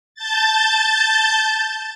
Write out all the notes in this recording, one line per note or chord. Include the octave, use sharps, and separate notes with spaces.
A5 G6 A6